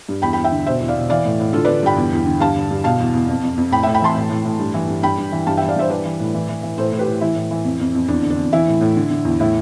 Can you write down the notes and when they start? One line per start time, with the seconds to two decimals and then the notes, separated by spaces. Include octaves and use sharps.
0.09 G2
0.22 E2 G5 B5
0.33 G5 B5
0.37 E2
0.44 E5 G5
0.52 D3
0.66 B2 C5 E5
0.80 E2
0.88 D5 F5
0.95 B2
1.10 E3 D5 F5
1.25 A2
1.40 A2
1.53 D3 F4 A4
1.64 D3 B4 D5
1.83 G2 G5 B5
1.97 E2
2.12 E2
2.26 D3
2.40 G2 F5 A5
2.56 D3
2.71 G2
2.84 B2 F5 A5
3.00 E2
3.14 E2
3.28 F2
3.44 F2
3.58 F2
3.71 A2 G5 B5
3.83 A2 E5 G5
3.94 G5 B5
4.01 E3 A5 C6
4.16 A2
4.30 A2
4.45 A2
4.59 G2
4.74 E3
4.88 G2
5.02 G2 G5 B5
5.18 G2
5.32 E3
5.46 G2 F5 A5
5.57 E3 E5 G5
5.69 D5 F5
5.76 G2 C5 E5
5.90 E3 B4 D5
6.05 E3
6.20 A2
6.34 E3
6.49 E3
6.63 E3
6.78 A2 A4 C5
6.92 A2
6.99 G4 B4
7.07 A2
7.21 E3 E4
7.36 A2
7.51 E3
7.65 F2
7.80 F2
7.95 F2
8.08 E2 D4
8.23 D3
8.30 D4
8.38 E2
8.53 E3 E4
8.67 A2
8.81 A2
8.96 D3
9.10 D3
9.25 E2
9.40 A2 E4